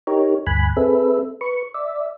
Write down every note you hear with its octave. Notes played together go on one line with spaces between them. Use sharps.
D#4 G4 A#4 C#5
D2 G2 G#5 B5 F#6
C4 G#4 A4 B4 E5
B4 C#6
D5 E5